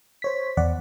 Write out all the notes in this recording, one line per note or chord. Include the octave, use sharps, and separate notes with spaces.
C5 C#5 B6
E2 D5 F#5